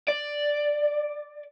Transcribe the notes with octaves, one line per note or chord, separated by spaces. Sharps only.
D5